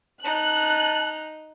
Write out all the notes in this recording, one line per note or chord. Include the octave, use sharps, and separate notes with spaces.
D#4 A5 F#6